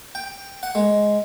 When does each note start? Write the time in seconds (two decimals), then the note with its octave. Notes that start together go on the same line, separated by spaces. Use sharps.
0.15 G5
0.63 F#5
0.75 G#3